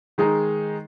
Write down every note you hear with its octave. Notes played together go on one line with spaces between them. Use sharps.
D#3 G#3 D#4 G#4